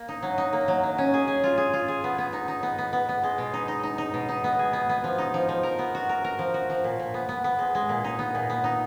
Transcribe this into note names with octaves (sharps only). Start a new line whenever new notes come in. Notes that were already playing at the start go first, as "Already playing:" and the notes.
Already playing: A#3
D#4
F#3
D#4
A#3
F#3
F#3
C#4
G#4
G#4
F4
G#4
F4
G#4
B3
B3
D#4
D#4
B3
B3
B3
B3
G#3
B2
D#4
D#4
D#4
D#4
B2
D#4
B3
G#4
B3
B3
F3
D#4
F3
F3
A#4
B3
F#4
A#4
A#4
F3
F#4
F3
A#2
A#2
B3
B3
B3
G#3
G#3
A#2
D#4
B3
A#2
B3
D#4